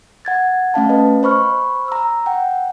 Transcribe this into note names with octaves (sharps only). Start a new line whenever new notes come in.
F#5 G#6 A6
A3 C#4 F5 A5
B4 D#5
C5 B5 C#6 F6
A#5 E6
F#5 G5